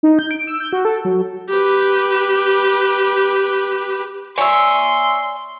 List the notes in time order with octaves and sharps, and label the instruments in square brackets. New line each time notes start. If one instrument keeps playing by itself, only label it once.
[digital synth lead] D#4
G6
D7
E6
G6
F#4
A4
F#3
[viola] G4 B4
[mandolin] C#5 E5 [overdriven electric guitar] D5 G#5 [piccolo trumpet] C6